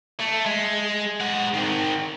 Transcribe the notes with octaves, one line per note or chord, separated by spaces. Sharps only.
A3
G#3
G#3 F#5
D#3 C4